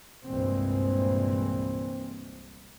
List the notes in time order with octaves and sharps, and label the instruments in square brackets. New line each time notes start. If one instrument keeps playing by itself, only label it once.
[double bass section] C2 G2 A#2 E3 G#3 C4